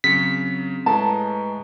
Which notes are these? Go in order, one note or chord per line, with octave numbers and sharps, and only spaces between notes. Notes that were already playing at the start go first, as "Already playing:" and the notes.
C#3 F#3 C4 B6 C#7
A2 G#3 B4 A5 A#5